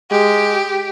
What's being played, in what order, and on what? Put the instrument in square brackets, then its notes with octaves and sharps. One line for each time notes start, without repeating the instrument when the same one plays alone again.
[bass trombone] G#3 [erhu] G4